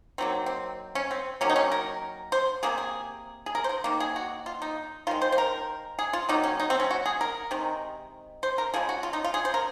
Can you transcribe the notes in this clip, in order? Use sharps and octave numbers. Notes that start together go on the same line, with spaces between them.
D#3 F#3 A#3 C4
C4
C#4
C4
D#3 F#3 A#3 C#4
D#4
C#4
A#4
C5
C3 D#3 A#3 G#4
G#4
G#4
A#4
C5
A#4
D#3 A#3
G#4
F#4
F4
D#4
D#3 G#3 F4
C5
C5
A#4
G#4
F4
D#3 F#3 A#3 D#4
C#4
D#4
C4
C#4
F#4
G#4
A#4
C3 D#3 G#3
C5
A#4
C#3 F3 G#3 G#4
F#4
F4
D#4
F4
G#4
C5
A#4